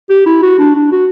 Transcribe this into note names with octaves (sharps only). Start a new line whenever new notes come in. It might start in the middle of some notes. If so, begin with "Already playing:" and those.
G4
E4
F#4
D4
D4
F#4